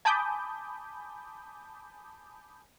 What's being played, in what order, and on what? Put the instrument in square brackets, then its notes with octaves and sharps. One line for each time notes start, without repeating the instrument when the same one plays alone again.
[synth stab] G#5 A5 B5 D6 D#6 G6